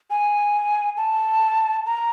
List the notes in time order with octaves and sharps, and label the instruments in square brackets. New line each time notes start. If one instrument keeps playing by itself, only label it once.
[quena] G#5
A5
A#5